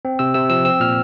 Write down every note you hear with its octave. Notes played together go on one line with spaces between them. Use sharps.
C4
C3 E6
C3 E6
F3 E6
C4 E6
A#2 F6